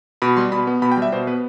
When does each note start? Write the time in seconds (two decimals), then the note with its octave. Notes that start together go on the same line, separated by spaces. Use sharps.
0.22 B2 B5
0.37 G3 C6
0.52 B2 B5
0.67 B3
0.82 B2 B5
0.92 G5
0.97 G3
1.02 E5
1.12 B2 C5
1.27 B3 B4